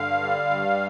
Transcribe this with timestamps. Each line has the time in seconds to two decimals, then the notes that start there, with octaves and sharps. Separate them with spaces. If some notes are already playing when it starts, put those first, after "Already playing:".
Already playing: G2 D3 F5
0.21 G3
0.50 G2